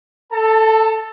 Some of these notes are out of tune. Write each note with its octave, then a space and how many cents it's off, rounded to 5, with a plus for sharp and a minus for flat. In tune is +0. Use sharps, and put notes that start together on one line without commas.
A4 +0 A5 +35